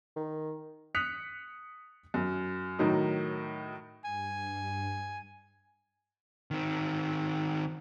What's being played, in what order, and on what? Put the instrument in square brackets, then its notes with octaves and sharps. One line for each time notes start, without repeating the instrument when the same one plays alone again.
[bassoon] D#3
[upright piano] D#6 F#6 B6 C#7 F7
F#2
A2 D#3 F#3 D#4
[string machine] G2 [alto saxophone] G#5
[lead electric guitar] D#3 C4